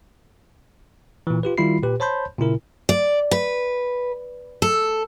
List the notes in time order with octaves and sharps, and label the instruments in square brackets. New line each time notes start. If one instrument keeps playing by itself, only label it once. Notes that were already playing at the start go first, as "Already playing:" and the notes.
[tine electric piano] A#2 E3
F4 G4 B4
D#3 G3 E4 F4 B5 C7
A#2 G4 B4
C5 C#5 A5 B5 C6 G6
A#2 C#3 E4 A#4
[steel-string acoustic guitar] D5
B4
A4